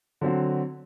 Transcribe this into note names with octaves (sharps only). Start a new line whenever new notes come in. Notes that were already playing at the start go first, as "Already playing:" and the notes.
D3 F#3 C4 F#4